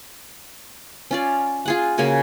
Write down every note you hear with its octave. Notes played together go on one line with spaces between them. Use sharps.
C#4 F4 D5
F4 G#4 F#5
C#3 A#3 F#4 G#5